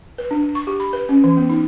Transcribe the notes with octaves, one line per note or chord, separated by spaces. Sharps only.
B4
D4
C#6
G4
B5
B4
C#4
E3
B3
D#4